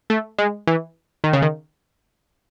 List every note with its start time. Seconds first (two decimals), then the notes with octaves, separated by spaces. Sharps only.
0.10 A3
0.38 G#3
0.67 E3
1.24 D#3
1.33 C#3
1.42 D#3